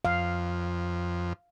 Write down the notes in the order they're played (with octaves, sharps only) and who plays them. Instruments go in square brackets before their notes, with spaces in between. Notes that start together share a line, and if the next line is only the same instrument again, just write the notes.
[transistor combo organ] F2 [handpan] F5